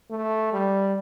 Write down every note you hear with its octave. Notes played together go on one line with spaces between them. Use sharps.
A3
G3